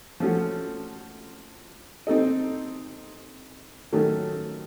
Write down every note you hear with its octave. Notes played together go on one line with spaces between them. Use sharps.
F3 A3 C#4 F#4
C4 D#4 A4 D#5
D#3 F#3 A3 C#4 A4